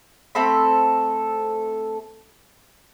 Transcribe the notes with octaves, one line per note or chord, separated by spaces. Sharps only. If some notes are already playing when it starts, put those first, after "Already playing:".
A3 C4 A4 B5